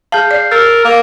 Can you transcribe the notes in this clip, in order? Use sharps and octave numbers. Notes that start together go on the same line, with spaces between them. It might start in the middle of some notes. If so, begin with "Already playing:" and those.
G#4 F5 A5 G6
D5 C7
A#4 E6 A6
A#3